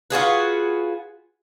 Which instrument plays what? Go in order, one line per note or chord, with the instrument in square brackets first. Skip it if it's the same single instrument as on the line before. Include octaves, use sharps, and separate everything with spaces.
[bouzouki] F4 F#4 G#4 B4